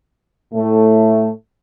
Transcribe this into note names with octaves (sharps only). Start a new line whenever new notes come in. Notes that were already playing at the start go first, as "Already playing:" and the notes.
A2 A3